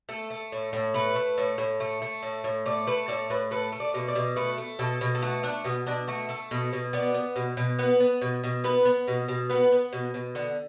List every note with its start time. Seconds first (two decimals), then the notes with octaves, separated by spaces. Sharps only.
0.09 A3 A4
0.30 A3
0.52 A2
0.73 A2
0.94 A3 B4
1.16 A3
1.38 A2
1.58 A2
1.80 A3
2.02 A3
2.23 A2
2.44 A2
2.65 A3 D5
2.87 A3 B4
3.08 A2 D5
3.30 A2 B4
3.51 A3 B4
3.72 A3
3.80 D5
3.94 B2
4.08 D5
4.15 B2
4.36 A3 B4
4.58 A3
4.79 B2 A4
5.01 B2
5.15 A4
5.22 A3 F#4
5.43 A3 D4
5.64 B2 B3
5.86 B2 D4
6.08 A3 F#4
6.29 A3 A4
6.51 B2 A4
6.73 B2
6.93 B3 D5
7.14 B3
7.36 B2
7.57 B2
7.79 B3 B4
8.00 B3
8.22 B2
8.44 B2
8.64 B3 B4
8.85 B3
9.08 B2
9.28 B2
9.50 B3 B4
9.72 B3
9.93 B2
10.14 B2
10.35 D3 B3